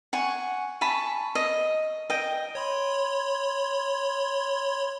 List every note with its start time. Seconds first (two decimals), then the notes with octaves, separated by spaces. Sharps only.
0.13 F#5 G#5 C#6
0.81 G#5 A5 B5 C#6
1.35 D#5
2.10 D#5 G5
2.55 C#5 B5 C6